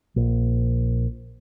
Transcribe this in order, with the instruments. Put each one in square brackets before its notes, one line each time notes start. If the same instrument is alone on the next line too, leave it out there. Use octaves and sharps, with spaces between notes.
[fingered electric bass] A#1